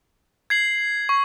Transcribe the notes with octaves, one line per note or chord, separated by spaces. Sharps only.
G#6 C7 F#7
C#6